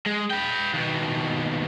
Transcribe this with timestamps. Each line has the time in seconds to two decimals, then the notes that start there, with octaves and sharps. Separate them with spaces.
0.06 G#3
0.30 B4 G5
0.73 D#2 B2